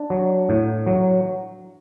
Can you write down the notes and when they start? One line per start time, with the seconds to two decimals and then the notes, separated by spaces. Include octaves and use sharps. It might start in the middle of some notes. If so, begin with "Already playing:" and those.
Already playing: D4 D5
0.10 F#3
0.49 A2
0.87 F#3